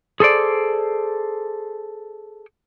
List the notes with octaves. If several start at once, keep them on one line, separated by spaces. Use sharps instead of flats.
G#4 A4 C5 D5